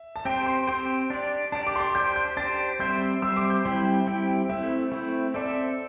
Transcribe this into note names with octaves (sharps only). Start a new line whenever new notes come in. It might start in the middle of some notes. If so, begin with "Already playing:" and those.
Already playing: E5
A5
C4 G4 C5 G5
C6
C4 G4 C5 C6
D4 G4 D5
D4 G4 D5 A5
D6
C6
D6
D4 G4 C5 G6
G6
D4 G4 C5 A6
G3 C4 G4 C5 E5 G6
G3 C4 G4 C5 E5 E6
D6
G6
G3 C4 E4 G4 G5
G5
G5
G3 C4 E4 G4 G5
G5
A3 C4 E4 E5
A3 C4 E4
C4 A4 D5 E5